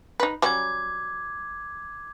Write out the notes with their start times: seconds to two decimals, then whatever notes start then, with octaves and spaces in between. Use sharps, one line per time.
0.20 D#4 B4
0.42 F#3 G3 C#4 D6 G#6